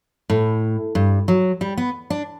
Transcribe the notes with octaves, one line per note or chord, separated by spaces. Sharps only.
A2
G2
F#3
G3
B3
D4